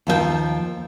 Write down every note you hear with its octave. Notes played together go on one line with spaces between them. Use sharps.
D#2 F3 D#5 G5